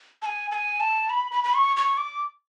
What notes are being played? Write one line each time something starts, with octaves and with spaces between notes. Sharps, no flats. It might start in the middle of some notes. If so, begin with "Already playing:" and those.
A5
G#5
A5
G#5
A5
B5
B5
B5
C#6
C#6
D6